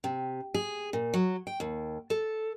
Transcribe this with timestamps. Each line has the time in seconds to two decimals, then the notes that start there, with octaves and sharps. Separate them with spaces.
0.04 C3
0.54 G#4
0.93 A#2
1.14 F#3
1.47 G5
1.60 D#2
2.10 A4